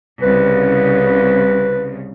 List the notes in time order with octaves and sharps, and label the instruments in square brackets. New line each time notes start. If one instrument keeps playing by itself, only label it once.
[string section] C2 C#3 [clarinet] B4